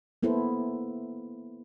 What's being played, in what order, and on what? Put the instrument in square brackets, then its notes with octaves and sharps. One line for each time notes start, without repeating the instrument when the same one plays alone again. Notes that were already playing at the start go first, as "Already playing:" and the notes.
[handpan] A#3 B3 E4 A4 C5